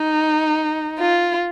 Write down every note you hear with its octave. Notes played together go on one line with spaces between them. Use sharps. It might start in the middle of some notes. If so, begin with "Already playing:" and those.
Already playing: D#4
F4